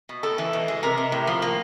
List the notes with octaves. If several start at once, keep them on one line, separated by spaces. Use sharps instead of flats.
B2
A2 A4
E3
B2
G#3
C3 A#4
C3
A2
F3
A#3